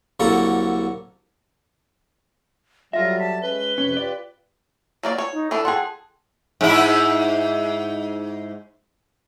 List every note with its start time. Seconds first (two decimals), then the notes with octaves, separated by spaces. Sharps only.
0.20 C2 D3 F#3 A#3 A4 A#5
2.93 F#3 G3 F4 A4 E5 A#6
3.19 A5 B6
3.42 G#3 C#4 B4 G7
3.78 F2 C3 C#4
3.97 F4 G4 D5
5.03 F#3 A#3 D5
5.18 C#5
5.33 D#4
5.51 E3 D4 A4
5.65 G#4 F#5 G5 A5 C6
6.61 G#2 E4